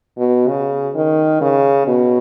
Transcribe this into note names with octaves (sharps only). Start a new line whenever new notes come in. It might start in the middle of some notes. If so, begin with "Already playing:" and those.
B2
C#3
D#3
C#3
B2